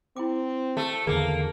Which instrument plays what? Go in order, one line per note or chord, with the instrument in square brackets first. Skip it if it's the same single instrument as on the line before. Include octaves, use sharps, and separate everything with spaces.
[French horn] C4 [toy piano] E4 G5 D6
[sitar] A3
[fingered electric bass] E2 D3 D#3 [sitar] A#3 [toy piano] G#4 B4 G#5 [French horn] A4